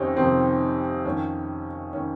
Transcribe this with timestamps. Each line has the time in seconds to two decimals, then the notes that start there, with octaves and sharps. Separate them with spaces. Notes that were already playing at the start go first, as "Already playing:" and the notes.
Already playing: F2 C3 D#3 C4 C#4 D#4
0.17 F2 C3 D#3 C4
1.05 F2 D#3 C#4
1.93 D#3 C#4